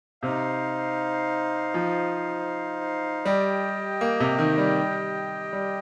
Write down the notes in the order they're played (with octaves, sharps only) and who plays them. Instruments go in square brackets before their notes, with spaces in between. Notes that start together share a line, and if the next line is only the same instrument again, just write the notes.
[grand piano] C3 [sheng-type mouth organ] D#4 C5 F5
[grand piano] F3
[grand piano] G3 [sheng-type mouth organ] G4 D#5 G5
[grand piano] A#3
C3
D#3
G3
G3